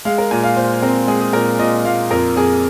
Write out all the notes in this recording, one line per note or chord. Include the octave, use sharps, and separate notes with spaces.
G#3 F5
A#4
A#2 G#5
F5
A#2 C5
C4 A#4
G#3 G#4
G#4
A#2 A#4
A#2 D#5
A#2 F5
F2 A#4
F2 G#4